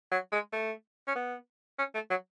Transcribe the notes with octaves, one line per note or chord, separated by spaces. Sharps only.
F#3
G#3
A3
C#4
B3
C#4
A3
F#3